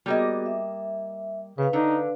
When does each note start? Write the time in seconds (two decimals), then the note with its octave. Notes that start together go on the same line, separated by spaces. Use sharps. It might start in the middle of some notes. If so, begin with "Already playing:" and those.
0.06 G3 A#3 B3 F#4 G#4 D#5
0.46 E5
1.58 C#3 B4 F5
1.73 D3 D#4